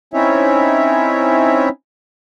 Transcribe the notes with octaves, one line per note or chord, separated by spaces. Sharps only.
C4 C#4 D#4 E4 C#5 E5